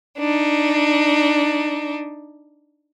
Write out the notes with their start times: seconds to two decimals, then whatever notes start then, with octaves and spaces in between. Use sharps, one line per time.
0.17 D4 D#4